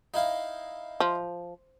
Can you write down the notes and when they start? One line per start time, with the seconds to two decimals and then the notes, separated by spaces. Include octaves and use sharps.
0.14 D#4 E4 F5
1.00 F3